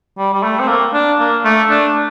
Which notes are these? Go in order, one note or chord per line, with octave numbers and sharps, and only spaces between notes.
G3
G3
A3
C4
A#3
D4
A#3
A3
D4